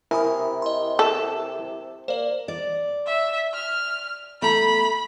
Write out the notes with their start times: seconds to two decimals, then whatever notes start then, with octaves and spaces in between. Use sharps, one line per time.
0.11 C3 E4 A#4 E5 G#5 B5 D#6
0.62 D#5 C6
0.99 A4 A5 E7
2.08 A#3 C5 D5
2.48 D5
3.06 E5
3.54 F6
4.42 A3 A#5 B5